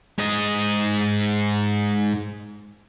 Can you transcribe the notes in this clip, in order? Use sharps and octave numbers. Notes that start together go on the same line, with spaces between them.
G#2 D#5